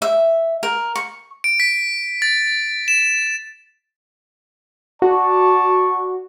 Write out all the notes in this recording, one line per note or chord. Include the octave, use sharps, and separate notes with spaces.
E5
A#4
C#6
D7
B6
A6
E7
F#4 D5 A5 C#6